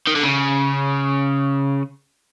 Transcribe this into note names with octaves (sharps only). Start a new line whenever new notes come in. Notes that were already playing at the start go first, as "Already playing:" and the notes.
D#3
D3
C#3